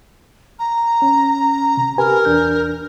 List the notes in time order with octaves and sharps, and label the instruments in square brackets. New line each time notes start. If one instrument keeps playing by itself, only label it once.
[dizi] A#5
[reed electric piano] C#4
C3
[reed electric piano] G4 B4 G#5 [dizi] A#4
[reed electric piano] E2 D4 G6